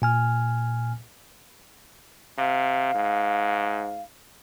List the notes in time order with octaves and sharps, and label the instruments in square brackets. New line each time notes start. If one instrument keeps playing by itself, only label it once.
[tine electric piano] A#2 G#5 F6
[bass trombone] C3 [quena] F5
[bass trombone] G#2